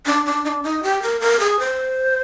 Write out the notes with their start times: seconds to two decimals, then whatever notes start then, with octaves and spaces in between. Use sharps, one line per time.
0.06 D4
0.26 D4
0.45 D#4
0.49 D4
0.64 D#4
0.83 G4
1.02 A#4
1.21 A#4
1.40 G#4
1.59 C5